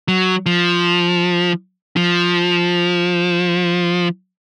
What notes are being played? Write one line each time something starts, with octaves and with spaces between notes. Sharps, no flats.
F#3
F3
F3